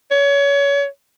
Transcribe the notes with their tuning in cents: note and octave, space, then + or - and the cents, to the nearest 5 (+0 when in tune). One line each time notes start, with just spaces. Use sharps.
C#5 +25